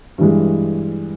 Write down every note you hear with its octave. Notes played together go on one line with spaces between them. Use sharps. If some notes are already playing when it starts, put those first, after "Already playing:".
G2 E3 G#3